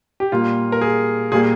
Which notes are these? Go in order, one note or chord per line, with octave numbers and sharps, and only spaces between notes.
G4
A#2 G3 A#3 F4
A#4
G#4
A#2 G3 A#3 G#4